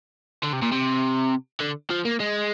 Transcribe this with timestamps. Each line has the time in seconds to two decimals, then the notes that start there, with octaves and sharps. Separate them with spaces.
0.43 D3
0.53 C3
0.62 A#2
0.72 C3
1.60 D3
1.90 F3
2.05 A#3
2.20 G#3